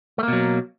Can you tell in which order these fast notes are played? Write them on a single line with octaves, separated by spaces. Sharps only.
A3 A#3 B2 F#3